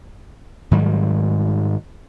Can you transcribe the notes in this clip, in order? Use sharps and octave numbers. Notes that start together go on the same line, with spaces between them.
G#2 D#3 F#3 G3